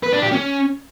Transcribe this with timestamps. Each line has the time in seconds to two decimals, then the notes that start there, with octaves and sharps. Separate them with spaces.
0.03 B4
0.12 D4
0.22 G4
0.32 C#4